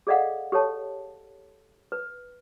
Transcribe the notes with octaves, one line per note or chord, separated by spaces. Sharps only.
G#4 A4 D5 D#5 F5 F#5
G4 A4 C#5 A5
B4